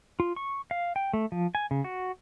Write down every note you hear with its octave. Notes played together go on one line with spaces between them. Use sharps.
F4
C#6
F5
G5
A3
F3
G#5
C#3
F#4